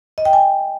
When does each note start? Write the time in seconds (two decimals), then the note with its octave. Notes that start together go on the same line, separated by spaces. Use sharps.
0.18 D#5
0.25 G5
0.33 G#5